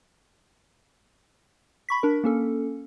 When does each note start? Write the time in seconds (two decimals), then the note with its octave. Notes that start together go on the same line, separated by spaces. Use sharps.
1.89 B5 C#6 B6
2.03 D4 A#4
2.24 A#3 C#4 A4